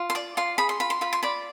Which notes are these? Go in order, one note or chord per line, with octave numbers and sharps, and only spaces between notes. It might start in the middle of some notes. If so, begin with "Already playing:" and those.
Already playing: F4
C6
D5 D6
F4 C6
G#4 B5
C6
F4 B5
C6
F4 B5
C6
D5 B5